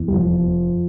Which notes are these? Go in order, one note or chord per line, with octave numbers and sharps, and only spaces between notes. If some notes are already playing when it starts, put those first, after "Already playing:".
Already playing: E2
G3
F1 F3